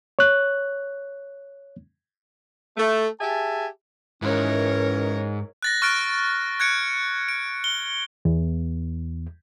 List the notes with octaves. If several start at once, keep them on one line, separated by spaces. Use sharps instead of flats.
C#5 F#6
A3
G4 G#4 E5 G#5 A5
G#2 D#3 E3 C#4 A#4 C#5
F#6 A6 A#6
C#6 F6 F#6 A6 D7
F#6 G#6 C#7 D7
D7
G7
E2